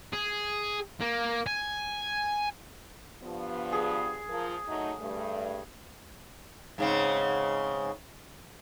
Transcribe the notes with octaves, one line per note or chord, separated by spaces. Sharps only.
G#4
A#3
G#5
G2 F3 B3
G#4
F3 A#4
F#3 A3 D#4
G2 A3
G#2 C#3 C4